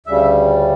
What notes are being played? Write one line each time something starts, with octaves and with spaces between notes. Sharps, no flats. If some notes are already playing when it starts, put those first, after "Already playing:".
D2 C#3 G3 E5